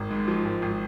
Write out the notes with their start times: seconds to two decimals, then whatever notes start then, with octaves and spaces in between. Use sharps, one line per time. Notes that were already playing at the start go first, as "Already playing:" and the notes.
Already playing: G#1 A#4
0.10 G#2
0.27 F3
0.45 G#1
0.62 G#1